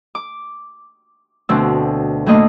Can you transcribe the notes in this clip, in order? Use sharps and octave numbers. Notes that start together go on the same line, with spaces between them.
D6
D2 B2 C4 D4 E6
A2 A3 A#3 D4 D#5